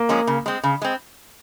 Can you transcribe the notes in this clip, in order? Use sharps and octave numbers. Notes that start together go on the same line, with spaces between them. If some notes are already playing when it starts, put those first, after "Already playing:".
Already playing: A#3
F3 G#3 C#4 G#4
C#3
G#3 C4
C#3
G#3 C4